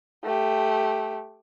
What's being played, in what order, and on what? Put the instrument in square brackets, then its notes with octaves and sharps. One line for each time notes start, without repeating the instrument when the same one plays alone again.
[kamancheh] A3 G4